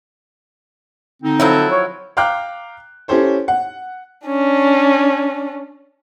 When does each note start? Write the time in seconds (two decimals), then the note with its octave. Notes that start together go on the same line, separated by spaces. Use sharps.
1.23 D3 C4 D#4
1.40 F3 F#3 E4 A4
1.71 C#5
2.17 F5 G5 A#5 D6 F6 F#6
3.08 C#4 E4 G4 A4 C5 C#5
3.48 F#5
4.27 C#4 D4